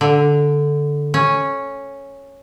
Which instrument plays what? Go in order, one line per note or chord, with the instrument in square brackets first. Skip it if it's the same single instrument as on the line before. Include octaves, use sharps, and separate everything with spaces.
[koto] D3
C#4